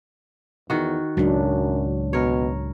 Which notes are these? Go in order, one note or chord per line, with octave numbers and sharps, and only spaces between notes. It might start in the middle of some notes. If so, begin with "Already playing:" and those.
E2 D#3 F#4
C#2 F#2 A2 F#3 D4
B2 A#4 C#5